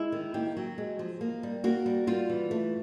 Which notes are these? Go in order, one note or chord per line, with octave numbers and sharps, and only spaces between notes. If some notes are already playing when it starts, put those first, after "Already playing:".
Already playing: G#3 E4
D#3
A#3 G4
F#3
G#3
F3
A#3
G3
A#3 F#4
G3
G3 F4
E3
A3